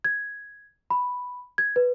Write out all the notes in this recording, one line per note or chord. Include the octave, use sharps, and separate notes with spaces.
G#6
B5
G#6
B4